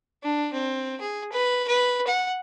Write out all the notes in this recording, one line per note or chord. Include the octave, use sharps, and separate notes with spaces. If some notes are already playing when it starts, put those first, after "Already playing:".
D4
C4
G#4
B4
B4
F#5